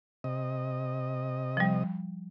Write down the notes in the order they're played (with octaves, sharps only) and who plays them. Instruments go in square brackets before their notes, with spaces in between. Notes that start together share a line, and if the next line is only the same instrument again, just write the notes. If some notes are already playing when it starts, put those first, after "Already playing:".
[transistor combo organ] C3 D#5
[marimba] F3 G3